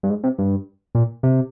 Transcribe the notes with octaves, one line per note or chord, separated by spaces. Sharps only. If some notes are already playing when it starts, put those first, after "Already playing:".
G2
G#2
C3
G2
A#2
C3